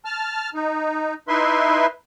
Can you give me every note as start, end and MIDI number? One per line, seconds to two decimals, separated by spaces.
0.05 0.50 81
0.05 0.50 89
0.54 1.14 63
1.28 1.87 63
1.28 1.87 64
1.28 1.87 71
1.28 1.87 76
1.28 1.87 84